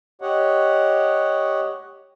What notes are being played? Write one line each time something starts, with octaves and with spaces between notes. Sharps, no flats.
G4 C#5 D#5 F#5